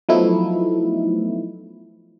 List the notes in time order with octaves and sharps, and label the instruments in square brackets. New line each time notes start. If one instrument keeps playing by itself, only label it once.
[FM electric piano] F3 F#3 A3 B3 D#4 E4